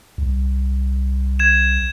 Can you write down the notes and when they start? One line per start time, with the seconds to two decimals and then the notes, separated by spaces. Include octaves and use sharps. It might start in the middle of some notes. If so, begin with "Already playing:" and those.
0.18 C2
1.39 G#6 E7